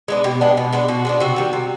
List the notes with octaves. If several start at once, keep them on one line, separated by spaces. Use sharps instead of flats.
G#3 B3 D4
B2 G4
G#3 B3 D4
B2
G#3 B3 D4
B2 F#4
G#3 B3 D4
C3 F#4
D#3 G3
C3